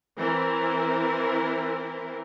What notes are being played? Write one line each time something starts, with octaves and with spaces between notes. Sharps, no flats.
E3 C4 E4 A#4